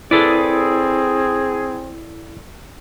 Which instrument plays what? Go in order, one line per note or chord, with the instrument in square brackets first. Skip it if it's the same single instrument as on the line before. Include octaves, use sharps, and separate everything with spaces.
[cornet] C4 [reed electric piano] E4 [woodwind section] G#4 [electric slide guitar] A4 B4 D5